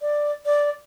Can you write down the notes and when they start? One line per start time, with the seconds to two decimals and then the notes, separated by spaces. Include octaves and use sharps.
0.01 D5
0.46 D5